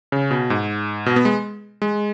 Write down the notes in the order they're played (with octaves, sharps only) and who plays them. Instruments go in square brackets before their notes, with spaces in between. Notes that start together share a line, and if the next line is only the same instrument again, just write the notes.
[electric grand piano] C#3
B2
G#2
B2
B3
G#3
G#3